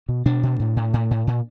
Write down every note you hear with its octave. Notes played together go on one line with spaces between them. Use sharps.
B2
B2 D4
B2
A2
A2
A2
A2
A#2